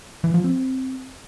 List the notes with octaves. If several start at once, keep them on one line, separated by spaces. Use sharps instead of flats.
E3
F3
C4